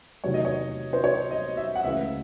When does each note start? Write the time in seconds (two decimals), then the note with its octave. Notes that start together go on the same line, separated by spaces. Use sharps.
0.24 E2 C3 D#3 F#3 A3 C#5
0.34 D#5
0.45 C#5
0.93 C5
1.04 C#5
1.31 D#5
1.57 E5
1.76 F#5
1.84 C#2 C#3 E3 A3 E5